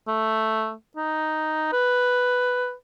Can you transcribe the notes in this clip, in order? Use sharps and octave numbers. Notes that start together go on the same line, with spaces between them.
A3
D#4
B4